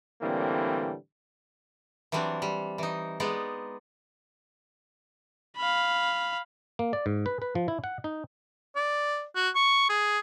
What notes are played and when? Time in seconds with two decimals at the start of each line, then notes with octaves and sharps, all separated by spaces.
0.22 A2 D3 E3 G3 A#3 C4
2.12 E3 F#3 G3 C4 D4
2.42 G3
2.78 E3 D#4
3.20 G#3 B3 D#4 D5
5.57 F5 B5
6.79 A#3
6.93 D5
7.06 G#2
7.26 B4
7.42 B4
7.55 F3
7.68 E4
7.84 F#5
8.04 D#4
8.76 D5
9.36 F#4
9.55 C#6
9.89 G#4